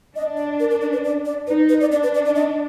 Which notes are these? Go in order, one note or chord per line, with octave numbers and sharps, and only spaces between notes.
D4 D#5
D5
A#4
A#4
A#4
B4
D5
D5
D#4 B4
B4
D5
D4 D5
B4
D5
D5
D#5